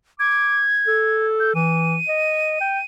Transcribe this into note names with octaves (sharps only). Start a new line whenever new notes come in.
D6 G#6
A4
G6
E3 D#7
D#5
G5